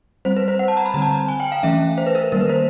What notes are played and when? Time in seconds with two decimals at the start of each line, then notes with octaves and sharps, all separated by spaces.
0.25 G3 C4 C5
0.36 B4
0.48 C5
0.59 F#5
0.68 A5
0.77 A#5
0.86 B5
0.94 D3 G3 C4 A#5
1.02 A5
1.11 A#5
1.28 G#5
1.40 G5
1.52 F5
1.63 E3 A3 C#4 E5
1.98 C5
2.06 B4
2.15 A#4
2.32 D#3 G3 A#3 A#4
2.41 B4
2.50 C5